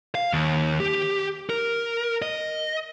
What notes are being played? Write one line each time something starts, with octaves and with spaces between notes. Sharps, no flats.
F5
D#2
G4
A#4
D#5